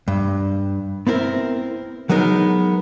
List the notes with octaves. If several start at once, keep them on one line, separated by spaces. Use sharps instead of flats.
G2
B3 C4 E4 A#4
F#3 G#3 B3 D#4 A#4